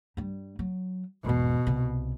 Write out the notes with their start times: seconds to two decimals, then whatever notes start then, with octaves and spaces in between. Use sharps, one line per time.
0.17 G2 G3
0.59 F#3
1.25 G#1 E2 B2
1.67 C2 C3